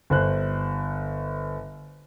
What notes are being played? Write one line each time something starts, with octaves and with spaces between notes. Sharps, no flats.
G1 C5 F#6